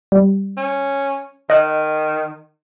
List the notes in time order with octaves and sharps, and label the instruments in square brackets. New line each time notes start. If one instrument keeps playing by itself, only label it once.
[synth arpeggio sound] G3
[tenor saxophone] C#4
[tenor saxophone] D#3 [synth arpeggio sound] D#5 F#6